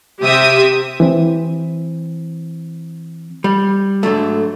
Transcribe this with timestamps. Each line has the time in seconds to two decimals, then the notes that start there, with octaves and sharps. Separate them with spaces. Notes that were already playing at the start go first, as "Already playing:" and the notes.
0.22 C3 G4 E5 D#6
1.00 E3 C4
3.44 G3
4.03 G#2 D3 F#3 A3